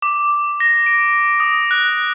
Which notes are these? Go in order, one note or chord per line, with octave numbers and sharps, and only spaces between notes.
D6
A#6
D7
D#6
F#6